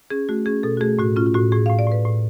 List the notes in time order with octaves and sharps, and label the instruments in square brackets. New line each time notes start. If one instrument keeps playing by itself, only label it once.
[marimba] C#4 G#4
A3 F#4
C#4 G#4
B2 A4
F#4
A3 G#4
A2 F#4
C#4 F4
F4
A2 F#4
A2 G#4
A2 F5
D5
A2 B4
A2